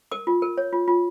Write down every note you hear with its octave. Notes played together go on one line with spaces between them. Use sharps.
A#4 D#6
F4
A#4
C#5
F4
F4